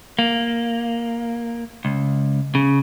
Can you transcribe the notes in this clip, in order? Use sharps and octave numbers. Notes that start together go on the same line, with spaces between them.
A#3
C#2
C#3